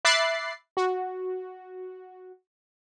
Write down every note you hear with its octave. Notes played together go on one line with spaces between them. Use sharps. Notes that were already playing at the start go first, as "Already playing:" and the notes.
E5 B5 D6 F#6 A6 C7
F#4